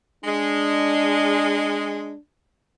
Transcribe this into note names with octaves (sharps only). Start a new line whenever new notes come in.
G#3 D4